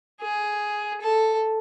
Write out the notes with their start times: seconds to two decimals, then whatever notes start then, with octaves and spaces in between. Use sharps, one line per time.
0.21 G#4
1.01 A4